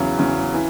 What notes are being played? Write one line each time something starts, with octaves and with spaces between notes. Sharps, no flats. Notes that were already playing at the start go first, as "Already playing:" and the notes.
Already playing: E2 C#3 F#3
E2 C#3 F#3
E3